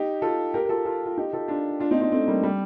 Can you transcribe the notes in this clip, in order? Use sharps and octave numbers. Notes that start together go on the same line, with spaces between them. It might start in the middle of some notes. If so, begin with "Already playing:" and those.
Already playing: D#4 G4
F4 A4
G4 A#4
A#4
F4 A4
F4 A4
F4
D#4 G4
F4 A4
D4 F4
D4 F4
C4 D#4
C4 D#4
A3 C4
G3 A#3
G3